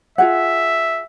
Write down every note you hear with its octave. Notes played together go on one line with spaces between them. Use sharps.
F4 G#4 E5 F#5